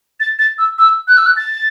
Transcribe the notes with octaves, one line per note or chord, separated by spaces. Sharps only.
A6
A6
E6
E6
F#6
E6
F#6
A6